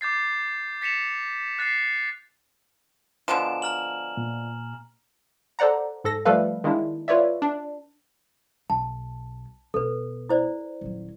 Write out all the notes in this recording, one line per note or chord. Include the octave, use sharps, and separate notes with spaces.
D6 G6 A6 C7
A6 B6 C#7 E7 F7
F#6 A6 B6 C7
B2 D3 F3 G#5 A#5 E7
A#5 F6 F#7
A#2
A4 C5 D5 F#5 A#5
G#2 A4 A#6
F3 G3 A3 A4 B4 F5
D#3 G#3 A#3 D4 E4
F4 B4 C#5 D5 E5
D4
B1 A5
B1 A4 B4
E4 C5 D5
D#1 F#3